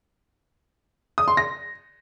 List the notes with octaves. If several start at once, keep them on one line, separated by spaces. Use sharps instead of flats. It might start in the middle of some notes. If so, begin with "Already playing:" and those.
D#6
C6
A#6